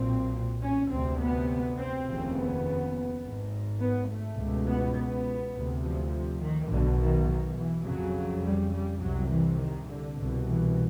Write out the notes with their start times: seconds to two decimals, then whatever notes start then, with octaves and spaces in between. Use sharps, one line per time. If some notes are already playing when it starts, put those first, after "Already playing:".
Already playing: B1 A#2 C4
0.62 C#4
0.90 D2 C3 C4
1.20 B3
1.78 C4
2.06 F1 D#2 C#3
2.35 B3
3.22 G#1 G#2
3.80 B3
4.09 A3
4.38 C#2 B2
4.67 B3
4.96 B3
5.54 D2 C3
5.83 F3
6.41 D#3
6.70 B1 B2 D3
6.99 D#3
7.28 D#3
7.57 E3
7.85 F1 F2 C#3 F#3
8.44 G3
8.73 G3
9.02 C2 C3 F#3
9.30 E3
9.59 D#3
9.88 D3
10.17 C2 B2
10.46 E3